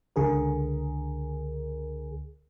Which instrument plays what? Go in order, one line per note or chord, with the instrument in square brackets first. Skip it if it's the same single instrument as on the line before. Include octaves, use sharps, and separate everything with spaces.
[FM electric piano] C#2 D3 G#4 A#4